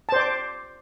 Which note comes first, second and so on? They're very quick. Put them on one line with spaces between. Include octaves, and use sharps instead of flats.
A5 C5 D5 D6